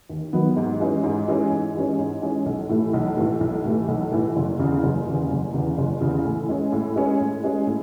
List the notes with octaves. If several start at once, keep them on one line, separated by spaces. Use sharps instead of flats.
D#2
D#3 F#3 B3
G#2
E3 G#3 C#4
G#2
E3 G#3 C#4
G#2
E3 G#3 C#4
G#2
E3 G#3 C#4
B1
A2 E3 A3
B1
A2 E3 A3
B1
A2 E3 A3
B1
A2 E3 A3
F#1
E2 C#3 E3
F#1
E2 C#3 E3
F#1
E2 C#3 E3
F#1
E2 C#3 E3
A2
G#3 C#4
A2
G#3 C#4
A2
G#3 C#4
A2